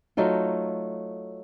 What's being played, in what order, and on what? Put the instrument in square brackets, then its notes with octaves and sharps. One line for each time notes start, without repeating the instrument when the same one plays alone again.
[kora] F#3 A3 D#4 F4